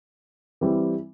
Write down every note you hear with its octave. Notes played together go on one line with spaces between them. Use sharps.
E3 G3 C4